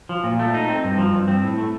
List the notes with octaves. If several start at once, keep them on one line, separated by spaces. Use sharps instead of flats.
F3
A#2
A3
D#4
C4
G2
F3
G2
C4
A2
A3